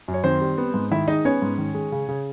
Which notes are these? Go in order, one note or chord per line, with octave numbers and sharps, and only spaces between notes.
F#2
C#5
D#3 C4 C5
G3
B3
G#2
D#3 E4 E5
G#3 D#4 D#5
B3 C#4 C#5
G#2
D#3
G#3
C#3
C#3